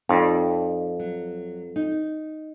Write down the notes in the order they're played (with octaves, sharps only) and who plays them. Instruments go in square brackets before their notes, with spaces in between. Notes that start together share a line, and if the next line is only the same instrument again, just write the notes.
[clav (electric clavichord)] F2 [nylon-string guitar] D#4 D5
[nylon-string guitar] F#3
D#4